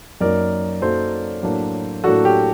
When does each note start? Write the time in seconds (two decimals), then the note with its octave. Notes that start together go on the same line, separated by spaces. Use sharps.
0.21 F#2 F#3 A#3 D#4 A#4 D5
0.82 F#2 F#3 A#3 D#4 A4 C5
1.43 A2 F#3 A#3 D4
2.04 A2 F#3 A#3 D4 F#4 A4
2.25 G4